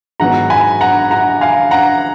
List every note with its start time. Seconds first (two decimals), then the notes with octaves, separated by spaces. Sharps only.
0.20 G#2 F#3 B3 F#5 A#5
0.50 G#5 B5
0.81 F#5 A#5
1.11 F#5 A#5
1.41 F5 G#5
1.71 F#5 A#5